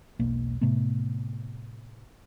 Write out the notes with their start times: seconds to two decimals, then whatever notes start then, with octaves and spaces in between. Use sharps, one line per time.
0.19 E1 B1 A#3
0.61 A2 C3 A3 B3